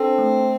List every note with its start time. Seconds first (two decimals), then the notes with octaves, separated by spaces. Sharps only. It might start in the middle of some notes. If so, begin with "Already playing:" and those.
Already playing: C4 D4 A4
0.18 A3